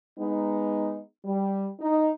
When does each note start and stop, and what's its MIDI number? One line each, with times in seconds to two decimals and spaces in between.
0.18 1.00 56
0.18 1.00 59
0.18 1.00 63
1.25 1.68 55
1.80 2.10 63